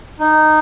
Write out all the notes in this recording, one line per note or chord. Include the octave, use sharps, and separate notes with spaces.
D#4